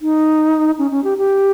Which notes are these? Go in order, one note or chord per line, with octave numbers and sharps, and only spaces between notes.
D#4
C#4
C#4
G4
G4